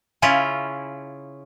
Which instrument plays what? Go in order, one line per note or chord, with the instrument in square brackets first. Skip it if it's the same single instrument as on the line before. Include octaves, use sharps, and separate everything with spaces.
[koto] C#3 C#4 E4 F4